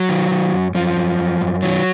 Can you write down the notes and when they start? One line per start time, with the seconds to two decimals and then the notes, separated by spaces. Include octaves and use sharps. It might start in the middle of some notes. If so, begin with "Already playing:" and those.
Already playing: F#3
0.09 D#3
0.31 D#3
0.53 F#2
0.75 F#2 F3
0.96 F#2
1.19 F#2
1.41 F#2
1.62 D#3 F#3